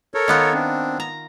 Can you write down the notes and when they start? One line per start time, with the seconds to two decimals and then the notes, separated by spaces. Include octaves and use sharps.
0.14 A4 A#4 C#5
0.28 D#3 B3 F4
0.54 C4 D4
1.00 A#5